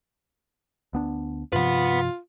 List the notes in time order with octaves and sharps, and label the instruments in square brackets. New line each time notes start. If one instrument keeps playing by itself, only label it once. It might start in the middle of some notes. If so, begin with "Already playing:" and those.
[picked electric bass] D2 B3 D4
[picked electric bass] G2 C3 F3 [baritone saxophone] F4 [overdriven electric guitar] B4 F#5